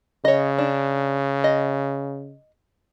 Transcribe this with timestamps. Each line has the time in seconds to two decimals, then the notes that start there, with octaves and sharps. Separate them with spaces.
0.25 C#3 C#5 D#5
0.58 D4
1.44 D#5